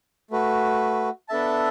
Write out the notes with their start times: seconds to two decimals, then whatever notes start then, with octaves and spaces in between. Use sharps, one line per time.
0.31 A3 F#4 B4
1.29 B3 D4 A4 E5 A5